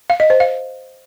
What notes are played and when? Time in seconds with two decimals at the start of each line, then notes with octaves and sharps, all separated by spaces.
0.10 F5
0.20 D#5
0.30 C5
0.40 F5